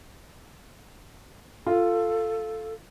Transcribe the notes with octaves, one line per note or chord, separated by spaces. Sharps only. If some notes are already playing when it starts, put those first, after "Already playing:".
F4 A4